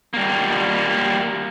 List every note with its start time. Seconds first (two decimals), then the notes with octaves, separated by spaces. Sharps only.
0.14 G3 A#3